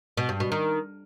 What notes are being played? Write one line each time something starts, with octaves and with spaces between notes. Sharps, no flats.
B2
G2
B2
D#3